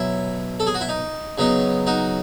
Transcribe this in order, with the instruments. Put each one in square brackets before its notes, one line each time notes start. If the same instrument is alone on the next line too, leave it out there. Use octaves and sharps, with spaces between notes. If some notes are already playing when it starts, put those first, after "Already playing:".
Already playing: [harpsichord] B2 F#3 C#4 E4
A4
G#4
F#4
E4
D#4
C#3 F#3 B3 D#4
D#4 F#4